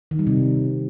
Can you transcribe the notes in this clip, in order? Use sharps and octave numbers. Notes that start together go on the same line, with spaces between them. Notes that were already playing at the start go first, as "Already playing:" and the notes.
D#3
G3
C3